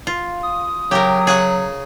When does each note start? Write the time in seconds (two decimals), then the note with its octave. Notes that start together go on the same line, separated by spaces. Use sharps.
0.07 F4
0.43 D#6
0.91 C#3 F#3 G4 A#4
1.27 C#3 G#4 F#5 C#6